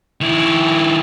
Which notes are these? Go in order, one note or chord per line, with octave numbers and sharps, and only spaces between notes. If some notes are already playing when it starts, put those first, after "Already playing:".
D#3 E4